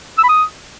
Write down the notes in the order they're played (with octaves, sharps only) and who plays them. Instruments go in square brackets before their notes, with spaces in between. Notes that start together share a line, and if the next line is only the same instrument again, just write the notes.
[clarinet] E6
B5
D#6